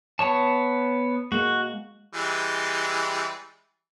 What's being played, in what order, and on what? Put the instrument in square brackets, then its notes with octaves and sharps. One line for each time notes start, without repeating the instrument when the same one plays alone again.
[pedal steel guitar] B3 C#5 A5
[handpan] G#3 A#3 [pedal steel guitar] F#4
[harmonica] E3 G3 G#3